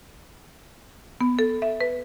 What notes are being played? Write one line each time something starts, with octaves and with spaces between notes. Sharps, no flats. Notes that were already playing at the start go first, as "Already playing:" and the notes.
B3
A4
E5
B4